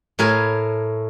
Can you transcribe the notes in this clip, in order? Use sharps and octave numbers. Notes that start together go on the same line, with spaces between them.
A2 A#4 G#5